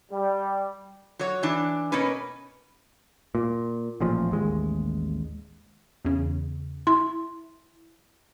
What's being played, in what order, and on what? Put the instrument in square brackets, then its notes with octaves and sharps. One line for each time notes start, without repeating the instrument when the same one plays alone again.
[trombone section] G3
[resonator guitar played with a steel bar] F#3 C#5
E3 D4
B2 A#3 C#4 B4
[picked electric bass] A#2
A1 A#2 F3
A1 D#2 G#3
[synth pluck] E2 C#3
[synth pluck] E4 [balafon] C6